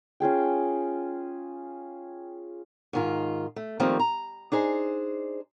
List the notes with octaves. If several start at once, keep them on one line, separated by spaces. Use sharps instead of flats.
C#4 F4 G#4 G5
G#2 D#3 F4
A3
D#3 F3 G3 A3 A#3 C4
A#5
D4 D#4 G#4 C5